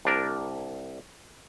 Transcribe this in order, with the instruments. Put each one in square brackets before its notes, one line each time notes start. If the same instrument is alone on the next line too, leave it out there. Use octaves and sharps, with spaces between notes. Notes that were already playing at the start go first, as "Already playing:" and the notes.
[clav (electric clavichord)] C2 D4 A#4